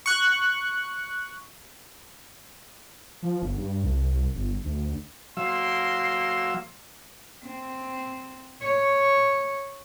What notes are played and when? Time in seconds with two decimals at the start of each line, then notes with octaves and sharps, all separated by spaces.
0.06 C#6 F#6
3.22 F3
3.42 G1
3.57 G2
3.84 C2
4.10 C2
4.34 G1
4.64 D2
5.37 F#3 A#3 F5 C6 E6
7.46 C4
8.62 C#5